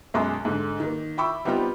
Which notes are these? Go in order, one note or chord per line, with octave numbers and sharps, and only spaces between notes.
B1 F#2 G#3 C6 D6
G#2 D3
D#3 A#3
E5 G5 B5 C#6 D6 E6
G3 B3 C4 D#4 F4 G4